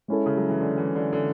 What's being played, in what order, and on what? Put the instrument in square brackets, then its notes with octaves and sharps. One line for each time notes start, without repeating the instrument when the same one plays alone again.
[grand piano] G#3 C#4 E4 A4
[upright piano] C#3
F#3
E3
D3
E3
D3
D3